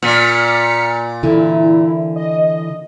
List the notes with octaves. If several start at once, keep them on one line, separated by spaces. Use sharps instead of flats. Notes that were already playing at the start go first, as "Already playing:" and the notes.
A#2 F6 B6 C#7
D3 E3 E4
D#5